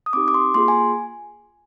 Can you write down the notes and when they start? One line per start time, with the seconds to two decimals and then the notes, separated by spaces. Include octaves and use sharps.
0.06 D#6
0.13 C4 D#4 G4 D6
0.28 D6
0.34 C6
0.54 A#3 F4 G#4 C6
0.68 G#5